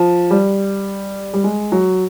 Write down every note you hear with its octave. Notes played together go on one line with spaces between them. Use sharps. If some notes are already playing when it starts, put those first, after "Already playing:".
Already playing: F3
G3
G3
G#3
F#3